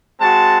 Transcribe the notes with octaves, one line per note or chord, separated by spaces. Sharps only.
G#3 C4 F#4 A5